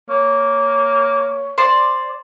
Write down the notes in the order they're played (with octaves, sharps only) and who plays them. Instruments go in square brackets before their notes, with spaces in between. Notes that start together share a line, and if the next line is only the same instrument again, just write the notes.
[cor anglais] A#3 [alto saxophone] C#5
[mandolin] C5 D5